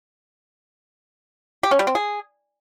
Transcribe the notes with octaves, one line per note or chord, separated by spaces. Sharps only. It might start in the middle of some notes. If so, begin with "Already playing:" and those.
G4
C#4
G3
C4
G#4